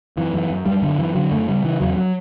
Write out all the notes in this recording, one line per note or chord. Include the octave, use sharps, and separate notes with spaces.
F#2 E3
F#2 E3
F#2
F#2 G3
F#2 D3
F#2 E3
D3 F#3
F#2 A3
C#3 G3
C#3 E3
E2 F#3
F#3